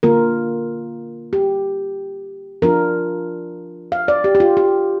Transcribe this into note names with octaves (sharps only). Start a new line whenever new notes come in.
D3 A#3 F4 A#4
G4
F3 D4 F4 A#4
F5
D5
G4
G4
F4
G4